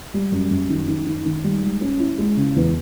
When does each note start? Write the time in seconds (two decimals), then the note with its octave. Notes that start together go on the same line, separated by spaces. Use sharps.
0.14 G3
0.32 F#2
0.51 F#2
0.70 D#3
0.88 D#3
1.06 D#3
1.26 D#3
1.44 G3
1.62 G#3
1.81 C#4
2.00 E4
2.18 G#3
2.37 C#3
2.56 E2